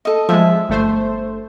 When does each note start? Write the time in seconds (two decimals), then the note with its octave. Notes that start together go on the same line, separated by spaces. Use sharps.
0.05 A4 D#5
0.29 F3 G#3 E5
0.69 G1 A3 C5